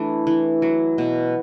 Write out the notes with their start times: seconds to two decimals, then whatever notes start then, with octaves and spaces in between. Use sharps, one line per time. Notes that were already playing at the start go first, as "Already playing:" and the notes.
Already playing: E3 A3 D4
0.27 E3
0.62 F#3
0.98 B2